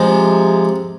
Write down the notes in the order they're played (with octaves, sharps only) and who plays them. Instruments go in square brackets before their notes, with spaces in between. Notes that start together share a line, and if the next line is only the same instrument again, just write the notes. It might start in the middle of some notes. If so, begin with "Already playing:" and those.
Already playing: [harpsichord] C3 F3 G#3 A#5